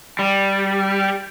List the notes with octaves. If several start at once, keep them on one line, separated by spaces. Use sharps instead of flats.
G3